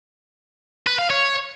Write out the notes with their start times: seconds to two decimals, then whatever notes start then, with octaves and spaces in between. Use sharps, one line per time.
0.87 B4
0.99 F5
1.10 C#5